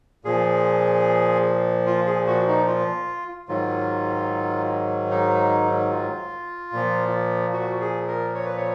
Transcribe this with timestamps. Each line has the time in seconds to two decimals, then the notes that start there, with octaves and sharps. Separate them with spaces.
0.24 A#2 F3 G#4
1.86 F4
2.07 G#4
2.27 F#4
2.47 D#4
2.67 F4
3.48 G#2 D#3 F#3 F4
5.11 D#4
5.91 F4
6.72 A#2 F3
7.53 F#4
7.80 G#4
8.07 A#4
8.35 C#5
8.45 B4
8.57 C#5